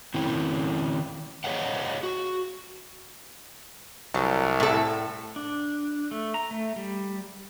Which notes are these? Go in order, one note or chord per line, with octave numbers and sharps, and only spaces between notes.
D#3 C4 C#4 E4
G#4 C#5 D#5 F5 F#5
F#4
C2 F#3
A2 A4
D4
A3
A#5
A3
G3